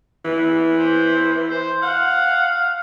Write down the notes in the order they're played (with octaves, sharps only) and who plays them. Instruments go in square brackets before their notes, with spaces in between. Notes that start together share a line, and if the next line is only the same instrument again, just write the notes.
[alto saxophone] E3
[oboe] C5
C5
[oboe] F5 [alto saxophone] F#5